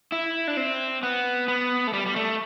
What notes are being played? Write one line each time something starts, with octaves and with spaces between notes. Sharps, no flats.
E4
D4
C4
B3
B3
A3
G3
G3
A3